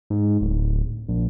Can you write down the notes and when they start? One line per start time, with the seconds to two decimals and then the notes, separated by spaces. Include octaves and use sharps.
0.10 G#2
0.41 D1
1.08 A#1